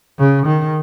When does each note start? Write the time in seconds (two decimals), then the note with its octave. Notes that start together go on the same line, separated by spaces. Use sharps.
0.19 C#3
0.46 D#3